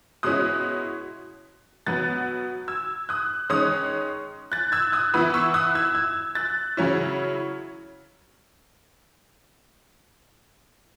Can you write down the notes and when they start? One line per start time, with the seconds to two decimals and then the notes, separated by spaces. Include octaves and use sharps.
0.23 B2 G#3 C#4 E4 D#6 F#6
1.86 B2 F#3 B3 F#6 A6
2.68 E6 G#6
3.09 D#6 F#6
3.50 D#3 G#3 C#4 D#6 F#6
4.52 F#6 A6
4.72 E6 G#6
4.92 D#6 F#6
5.14 E3 B3 E4 B5 D#6
5.34 C#6 E6
5.54 D#6 F#6
5.75 E6 G#6
5.95 E6 G#6
6.35 F#6 A6
6.77 C#3 F#3 C#4 E4